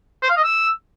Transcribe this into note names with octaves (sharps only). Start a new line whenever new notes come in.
C5
F5
D#5
E6